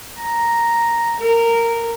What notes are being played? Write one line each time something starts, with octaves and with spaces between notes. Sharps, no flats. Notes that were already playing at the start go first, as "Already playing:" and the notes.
A#5
A#4